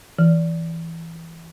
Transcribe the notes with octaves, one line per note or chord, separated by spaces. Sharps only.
E3